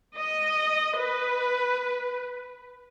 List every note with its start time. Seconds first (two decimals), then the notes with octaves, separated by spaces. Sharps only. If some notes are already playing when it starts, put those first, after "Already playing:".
0.17 D#5
0.99 B4